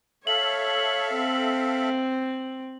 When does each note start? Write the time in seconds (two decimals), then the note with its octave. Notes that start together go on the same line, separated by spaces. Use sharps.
0.27 A4 C#5 E5 F5 F#7
1.17 C4